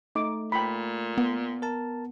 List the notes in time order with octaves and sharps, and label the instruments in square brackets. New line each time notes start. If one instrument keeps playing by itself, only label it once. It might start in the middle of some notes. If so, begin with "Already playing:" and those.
[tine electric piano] A3 [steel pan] D#4 D6
[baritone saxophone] A#2 [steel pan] G5 B5
[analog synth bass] B3
[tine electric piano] A#4 A5